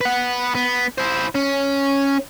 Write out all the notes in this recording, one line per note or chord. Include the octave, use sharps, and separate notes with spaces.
B4 F#5
B3
E4 C5
C#4